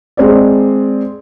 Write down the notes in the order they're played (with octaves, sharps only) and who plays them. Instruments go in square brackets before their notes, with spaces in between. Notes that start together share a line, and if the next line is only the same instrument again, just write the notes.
[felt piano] G#3 C4 D5